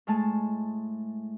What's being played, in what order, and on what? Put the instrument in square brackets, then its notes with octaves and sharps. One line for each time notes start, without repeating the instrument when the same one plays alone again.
[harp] A2 G#3 A3 A5